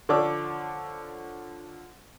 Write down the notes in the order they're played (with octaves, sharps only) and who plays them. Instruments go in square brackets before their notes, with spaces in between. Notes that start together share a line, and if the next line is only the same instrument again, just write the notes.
[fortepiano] D3 F3 C#5 D5 D6 E6